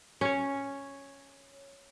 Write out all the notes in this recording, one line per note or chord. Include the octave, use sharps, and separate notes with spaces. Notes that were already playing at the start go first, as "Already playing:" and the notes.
C#4 C#5